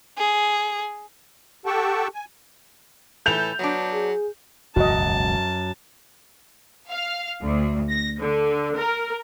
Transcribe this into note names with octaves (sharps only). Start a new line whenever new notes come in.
G#4
G4 A4 F#5 G5 A5 C#6
G#5
A2 E3 A4 B4 G6 F7
F#3 B3 D4
G#4
E1 C#2 F#2 F#4 D#5 A5
F5
D2
A#6
D3
A#4